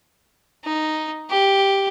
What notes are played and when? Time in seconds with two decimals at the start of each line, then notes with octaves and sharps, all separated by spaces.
0.65 D#4
1.30 G4